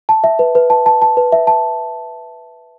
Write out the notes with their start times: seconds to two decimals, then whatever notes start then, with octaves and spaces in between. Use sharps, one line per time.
0.09 A5
0.24 E5
0.39 B4
0.55 B4
0.70 A5
0.86 A5
1.02 A5
1.17 B4
1.32 E5
1.47 A5